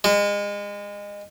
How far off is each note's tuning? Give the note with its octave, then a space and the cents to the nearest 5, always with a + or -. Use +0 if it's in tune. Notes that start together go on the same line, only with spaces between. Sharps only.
G#3 -30